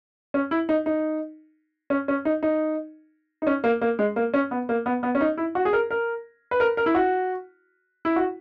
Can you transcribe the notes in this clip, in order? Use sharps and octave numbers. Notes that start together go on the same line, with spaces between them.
C#4
E4
D#4
D#4
C#4
C#4
D#4
D#4
D#4
C#4
A#3
A#3
G#3
A#3
C#4
B3
A#3
B3
B3
C#4
D#4
E4
F#4
G#4
A#4
A#4
B4
A#4
A#4
E4
F#4
E4
F#4